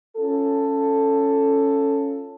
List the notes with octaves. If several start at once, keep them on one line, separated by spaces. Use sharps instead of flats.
C#4 F4 A4